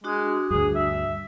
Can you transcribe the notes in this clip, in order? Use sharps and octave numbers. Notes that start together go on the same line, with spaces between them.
G#3 D4 F#4 D#6
D2 G2 G#4
E5